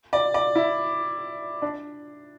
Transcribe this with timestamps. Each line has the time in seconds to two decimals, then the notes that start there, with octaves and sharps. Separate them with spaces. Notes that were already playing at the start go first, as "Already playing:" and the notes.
0.13 D5
0.34 D5
0.55 E4
1.62 D4